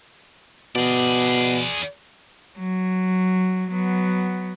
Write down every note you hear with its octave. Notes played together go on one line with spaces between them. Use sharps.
B2 G#4 D5
F#3
F#3 B3